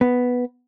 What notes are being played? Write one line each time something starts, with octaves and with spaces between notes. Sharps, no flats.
B3